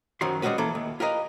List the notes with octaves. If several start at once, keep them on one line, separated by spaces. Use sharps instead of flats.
F#2 D#3 F3 F#3 C6
G3 G#3 A#3 C#4 F#4 B4
E3 A#3 A4
D#2
F4 G4 A#4 B4 D#5 F5